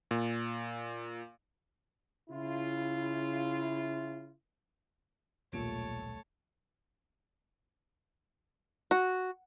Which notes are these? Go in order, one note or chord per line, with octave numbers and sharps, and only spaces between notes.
A#2
C#3 E4 F4
D#1 B1 A#2 G3 A3 C#5 A5 D7
F#4